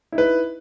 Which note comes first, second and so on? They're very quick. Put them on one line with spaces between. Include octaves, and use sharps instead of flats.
E4 D#4 B4